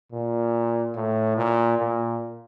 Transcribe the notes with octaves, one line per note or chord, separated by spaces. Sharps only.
A#2
A2
A#2
A#2